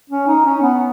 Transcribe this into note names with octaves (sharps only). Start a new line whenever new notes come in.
C#4
D#4
C#4
B3